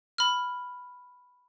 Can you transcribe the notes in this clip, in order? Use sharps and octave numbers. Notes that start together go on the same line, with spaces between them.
B5 F6